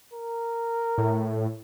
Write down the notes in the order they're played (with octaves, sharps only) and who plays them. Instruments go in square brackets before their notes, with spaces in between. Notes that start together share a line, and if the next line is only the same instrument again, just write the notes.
[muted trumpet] A#4
[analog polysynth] A2